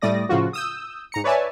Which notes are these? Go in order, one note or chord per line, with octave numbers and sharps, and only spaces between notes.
A2 G3 A3 D5 D#6 A#6
A2 C#3 F3 F4 F#4
D#6 E6 G6
G#2 A#5 C#7
B4 C#5 D5 E5 G#5 A5